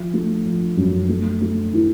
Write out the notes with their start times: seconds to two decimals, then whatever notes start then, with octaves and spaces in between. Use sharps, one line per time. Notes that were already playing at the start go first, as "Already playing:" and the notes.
Already playing: F3
0.13 A3
0.45 F3
0.77 F#2
1.09 A3
1.41 A3
1.73 E3